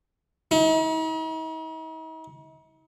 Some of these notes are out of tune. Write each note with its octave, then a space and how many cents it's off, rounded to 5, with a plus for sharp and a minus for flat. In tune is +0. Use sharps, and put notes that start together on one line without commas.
D#4 +45